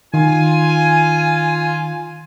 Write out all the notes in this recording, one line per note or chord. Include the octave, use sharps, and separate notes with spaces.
D#3 F4 G#5